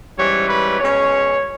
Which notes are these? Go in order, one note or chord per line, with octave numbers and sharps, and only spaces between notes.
G#2 E3 G3 C#4 C#5
B4
B2 G#3 C#4 C#5